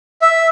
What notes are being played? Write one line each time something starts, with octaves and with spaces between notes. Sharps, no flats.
E5